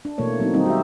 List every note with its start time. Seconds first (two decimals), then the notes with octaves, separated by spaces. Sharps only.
0.05 D4
0.18 B2 E3 A3 A#3 C#5
0.40 F#3 A#3 C4 D#4
0.53 D#3 G3 C4 D#4
0.66 F#4 G4 E5